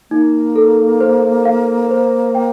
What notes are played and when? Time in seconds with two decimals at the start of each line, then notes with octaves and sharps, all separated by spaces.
0.11 A#3 D#4
0.56 A4
1.00 C5
1.45 F5
1.91 C5
2.35 G5